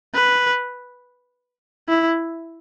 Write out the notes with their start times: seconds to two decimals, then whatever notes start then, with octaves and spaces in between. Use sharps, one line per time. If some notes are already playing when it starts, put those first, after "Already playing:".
0.14 B4
1.89 E4